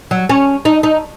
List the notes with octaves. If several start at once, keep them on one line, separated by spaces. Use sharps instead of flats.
F#3
C#4
D#4
D#4